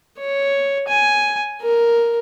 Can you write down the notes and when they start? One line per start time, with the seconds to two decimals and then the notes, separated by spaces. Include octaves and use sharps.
0.19 C#5
0.88 G#5
1.62 A#4